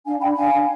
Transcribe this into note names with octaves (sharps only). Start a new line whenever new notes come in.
D4 F5 G#5
D4 G5 B5
D4 F5 G#5
D4